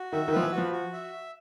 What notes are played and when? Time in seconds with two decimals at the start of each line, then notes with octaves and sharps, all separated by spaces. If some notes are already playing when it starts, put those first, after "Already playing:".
Already playing: F#4
0.12 D#3 E5
0.28 D#3
0.32 F3 B4
0.43 E3
0.52 F#4
0.58 F3
0.72 F#4
0.93 E5